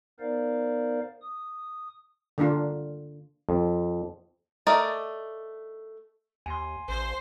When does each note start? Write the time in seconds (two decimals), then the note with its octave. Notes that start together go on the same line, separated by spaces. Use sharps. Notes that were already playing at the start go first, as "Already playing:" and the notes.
0.20 B3 D#4 A#4 C5 D5 F5
1.22 D#6
2.38 D3 A#3 D4 F4
3.49 F2
4.67 A3 A#4 D5 D#5
6.46 D#2 G#5 C6
6.88 A1 C5